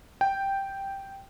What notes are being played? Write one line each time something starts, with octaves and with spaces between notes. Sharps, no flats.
G5